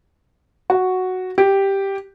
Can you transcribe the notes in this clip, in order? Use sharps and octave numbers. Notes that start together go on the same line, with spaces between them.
F#4
G4